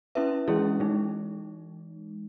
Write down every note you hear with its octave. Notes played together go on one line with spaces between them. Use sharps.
C#4 E4 B4 E5
E3 G#3 C#4 E4 G#4
E3 G#3 D#4